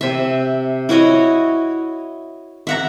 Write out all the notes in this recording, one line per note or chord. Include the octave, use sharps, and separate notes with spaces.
C3 E5
E4 F#4 C#5 D#5
E5 F#5 A#5